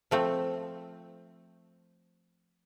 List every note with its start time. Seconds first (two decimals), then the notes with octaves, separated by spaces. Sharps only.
0.11 F3 A3 C4